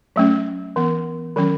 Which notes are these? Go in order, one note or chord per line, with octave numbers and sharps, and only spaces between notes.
F#3 A3 C#4
E3 B3
D#3 F#3 C#4